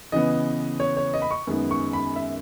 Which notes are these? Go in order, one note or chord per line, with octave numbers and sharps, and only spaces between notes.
C#3 E3 B3 D#5
C#5
C#5
D#5
B5
C#6
F#2 D#3 G#3 B3
C#6
B5
E5